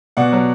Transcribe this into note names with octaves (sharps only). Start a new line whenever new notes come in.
B2 D5 F#5
F#3